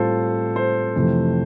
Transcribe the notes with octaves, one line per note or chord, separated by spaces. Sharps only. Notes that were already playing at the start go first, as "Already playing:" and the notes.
Already playing: A2 G3 C4 F4 A4 C5
C5
F2 C3 E3 A3